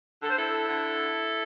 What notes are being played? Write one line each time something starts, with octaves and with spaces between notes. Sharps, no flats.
D3 A4
C5
E4 A4
D3